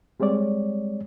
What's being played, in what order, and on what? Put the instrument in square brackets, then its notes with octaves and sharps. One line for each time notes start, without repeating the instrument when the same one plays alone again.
[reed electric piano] G3 G#3 C4 C#5 D5